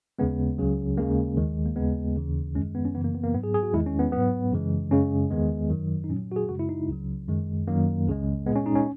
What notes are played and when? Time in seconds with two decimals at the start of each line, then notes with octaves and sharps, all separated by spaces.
0.19 D#2 C#3 G#3 B3
0.58 C#2 C#3 F#3
0.97 D#2 C#3 G#3 A#3
1.37 D#2 D#3 G#3
1.65 A#3
1.76 D#2 C#3 G#3 B3
2.16 D#2 C#3 E3
2.55 F#2 D#3 G#3 C#4
2.75 B3
2.85 C#4
2.94 F#2 C#3 E3 B3
3.04 A#3
3.15 B3
3.24 A#3
3.34 G#2 F#3 B3
3.43 G#4
3.54 G#4
3.63 F#4
3.74 E2 D#3 G#3 E4
3.86 C#4
3.99 B3
4.12 G#2 F#3 B3
4.52 F#2 C#3 E3 G#3
4.91 F#2 C#3 G#3 C#4
5.31 E2 D#3 G#3 B3
5.70 F#2 D#3 F#3
6.04 D#4
6.09 A#2 F#3 C#4
6.32 F#4
6.36 G#4
6.49 F#2 C#3 G#3 F#4
6.59 E4
6.69 D#4
6.88 C#2 C#3 F#3
7.28 F#2 D#3 G#3
7.68 F#2 D#3 F#3 A#3
8.07 C#2 C#3 G#3
8.46 G#3 B3
8.49 A#2
8.55 C#4
8.66 D#4
8.75 C#4